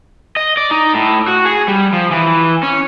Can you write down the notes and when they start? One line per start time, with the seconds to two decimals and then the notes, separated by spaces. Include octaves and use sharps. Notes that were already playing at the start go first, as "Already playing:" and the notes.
0.37 D#5
0.57 D5
0.71 D#4
0.94 A2
1.28 F#4
1.45 G#4
1.68 G3
1.93 F3
2.11 E3
2.63 C#4